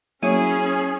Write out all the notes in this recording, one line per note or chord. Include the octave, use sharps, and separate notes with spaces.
F#3 A#3 C#4 E4 G#4 C#5 D#7